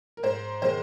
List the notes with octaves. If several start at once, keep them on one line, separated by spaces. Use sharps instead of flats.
A#4
G#2 C5
D#3 G#3 C5